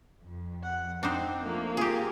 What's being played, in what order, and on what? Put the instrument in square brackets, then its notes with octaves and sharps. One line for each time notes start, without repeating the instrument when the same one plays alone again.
[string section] F2
[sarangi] F#5
[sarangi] C4 [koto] D4 D#4 C5
[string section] F3 A3 [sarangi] A#3
[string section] F4 A#4 [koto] G4 G#4